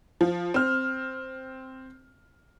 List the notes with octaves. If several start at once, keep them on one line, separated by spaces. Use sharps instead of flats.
F3
C4 F6